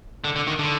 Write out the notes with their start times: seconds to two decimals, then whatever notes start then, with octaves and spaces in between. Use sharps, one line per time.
0.24 D3
0.36 D3
0.47 D#3
0.59 D3